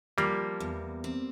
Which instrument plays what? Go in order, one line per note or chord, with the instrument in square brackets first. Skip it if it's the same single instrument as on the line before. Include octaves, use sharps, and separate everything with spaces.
[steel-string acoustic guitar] F3 [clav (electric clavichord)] G3 A#3
[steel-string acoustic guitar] E2
C4